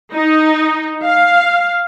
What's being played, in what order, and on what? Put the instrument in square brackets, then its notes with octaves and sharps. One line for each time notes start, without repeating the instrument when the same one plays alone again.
[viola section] D#4
F5